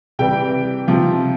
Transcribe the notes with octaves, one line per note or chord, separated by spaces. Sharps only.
C3 E3 G3 G4 G5
C3 F3